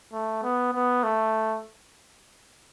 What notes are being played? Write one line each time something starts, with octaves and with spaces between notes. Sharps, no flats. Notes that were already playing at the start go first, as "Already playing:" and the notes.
A3
B3
B3
A3